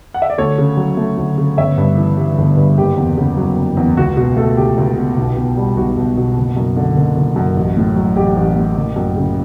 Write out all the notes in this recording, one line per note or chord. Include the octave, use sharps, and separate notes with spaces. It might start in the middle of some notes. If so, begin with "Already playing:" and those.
F#5
E5
D5
D2 A4 C#5
C#3
F#3
A3
D2
C#3
G1 C#5 E5
G2
E3
G3
G1
G2
F#1 G4
E2
C#3
F#3
F#1
E2
C#2 F#4
B2 F#4
A3 F#4 A4
C#2 G4
C#2
B2
B1
B2
G3
B1 F#4
B1
B2
F#1
F#2
D3
F#1
F#1
F#2
A1
A2
F#3
A1 G4
A1
A2
F#1
F#2
C#3